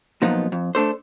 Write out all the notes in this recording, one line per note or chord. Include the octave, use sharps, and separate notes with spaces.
A#2 F3 F#3 B3 D#4 F4
F2
A3 D4 A4 C5